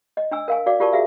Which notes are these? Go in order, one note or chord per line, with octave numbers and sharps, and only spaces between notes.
D#5
D4 G#5 E6
A#4 F5 G#5
F#4 D5 F5 D6
F4 G4 A#4 D5 A5 C#6
F#4 G#4 E5 F5